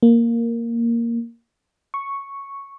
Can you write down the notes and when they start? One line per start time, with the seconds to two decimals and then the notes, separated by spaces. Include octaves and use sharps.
0.03 A#3
1.94 C#6